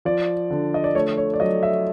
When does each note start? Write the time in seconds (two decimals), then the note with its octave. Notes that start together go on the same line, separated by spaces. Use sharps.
0.05 F3 D5
0.50 D3
0.74 D#5
0.84 D5
0.95 A3 C#5
1.17 C#5
1.34 D5
1.40 F#3 D#5
1.63 E5